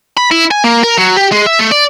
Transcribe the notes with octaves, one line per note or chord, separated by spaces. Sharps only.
B5
E4
G#5
A#3
A#4
F#3
G4
G#3
E5
A3
D5